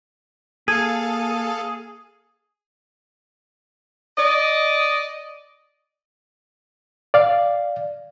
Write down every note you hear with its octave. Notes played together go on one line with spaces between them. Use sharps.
A#3 G#4 A4 F5 G#6 D#7
D5 D#5
D5 F5